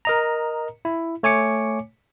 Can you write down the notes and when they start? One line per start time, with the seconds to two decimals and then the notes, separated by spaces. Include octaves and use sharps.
0.05 A#4 D#5 A#5
0.85 E4
1.23 A3 C#5 G#5 D6 C#7